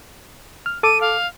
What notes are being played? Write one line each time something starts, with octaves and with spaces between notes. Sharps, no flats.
F6
A4 D6 D#7
F5